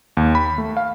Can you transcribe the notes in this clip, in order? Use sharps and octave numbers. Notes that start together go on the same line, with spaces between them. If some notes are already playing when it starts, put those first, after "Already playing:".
D#2
B5
A3
F5